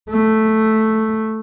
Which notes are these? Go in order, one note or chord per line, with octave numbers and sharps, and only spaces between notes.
A3